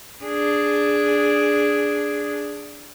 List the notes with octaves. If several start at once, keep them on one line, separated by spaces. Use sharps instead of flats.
D4 G#4